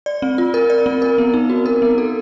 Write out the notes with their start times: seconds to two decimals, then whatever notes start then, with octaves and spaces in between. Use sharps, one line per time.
0.06 D5
0.22 C4
0.38 F4
0.54 A#4
0.70 D5
0.86 C4
1.02 A#4
1.18 B3
1.34 D#4
1.50 F#4
1.66 A#4
1.82 B3
1.98 A4